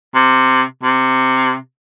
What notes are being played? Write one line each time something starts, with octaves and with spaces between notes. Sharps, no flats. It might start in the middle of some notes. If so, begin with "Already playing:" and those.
C3
C3